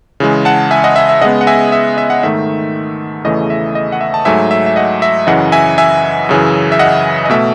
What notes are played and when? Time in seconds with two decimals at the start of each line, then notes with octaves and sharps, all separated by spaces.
0.20 C#3 E3 G#3
0.45 F#5 A5
0.71 E5 G#5
0.84 D#5 F#5
0.96 E5
1.09 E5
1.21 C#3 G#3 B3 D#5 F#5
1.41 F#5
1.47 E5 G#5
1.72 E5
1.98 E5
2.10 F#5
2.23 G#2 D#3 A3 E5
3.24 E2 C#3 E3 A3 D#5
3.50 E5
3.75 D#5
3.92 F#5
4.01 E5
4.14 A5
4.25 G#2 F#3 A3 E5 G#5
4.51 E5
4.66 E5
4.76 D#5 F#5
5.02 E5
5.27 F#2 C#3 E3 D#5 F#5
5.52 E5 G#5
5.78 E5 G#5
6.29 F#2 C#3 E3
6.72 E5
6.79 D#5 F#5
7.25 D#5
7.30 B2 A3 E5